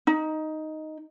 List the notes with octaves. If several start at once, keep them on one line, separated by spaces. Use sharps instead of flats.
D#4